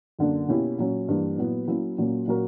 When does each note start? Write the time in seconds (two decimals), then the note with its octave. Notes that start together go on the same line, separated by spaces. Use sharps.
0.19 F#2 D3 A#3 D4
0.48 B2 A#3 C#4 E4 G4
0.78 A#2 F#3 C#4
1.08 G2 E3 G3 A#3
1.38 A#2 F#3 B3 E4
1.67 F#3 A#3 C#4 E4
1.98 A#2 F#3 A#3 C#4
2.28 A#2 F#3 C#4 F#4 A#4